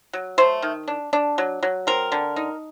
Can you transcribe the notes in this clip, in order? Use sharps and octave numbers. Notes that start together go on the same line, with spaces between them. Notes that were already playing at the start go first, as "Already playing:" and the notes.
F#3
A3 C5
D#3
D4
D4
F#3
F#3
C4 A#4
D3
D#4